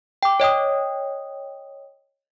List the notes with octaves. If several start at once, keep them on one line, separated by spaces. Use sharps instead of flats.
G5 D6
C#5 D#5 G5 D#6